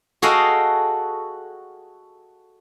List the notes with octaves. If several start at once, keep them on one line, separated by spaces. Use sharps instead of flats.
F#4 G#4 A4 D#5 F5 G5